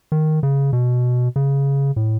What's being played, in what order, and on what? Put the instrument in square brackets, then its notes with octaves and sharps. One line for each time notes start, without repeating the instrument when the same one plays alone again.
[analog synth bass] D#3
C#3
B2
C#3
A2